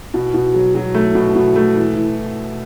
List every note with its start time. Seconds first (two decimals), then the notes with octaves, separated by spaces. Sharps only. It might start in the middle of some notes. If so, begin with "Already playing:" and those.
0.14 B2
0.34 B2
0.54 F#3
0.75 F#3
0.94 A3
1.15 B2
1.35 B2
1.56 A3
1.75 E3
1.96 E3